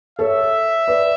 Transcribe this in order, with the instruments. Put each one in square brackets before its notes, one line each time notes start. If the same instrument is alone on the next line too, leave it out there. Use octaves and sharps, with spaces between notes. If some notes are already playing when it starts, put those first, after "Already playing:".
[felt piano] A4 C#5 [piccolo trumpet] E5
[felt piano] B4 D5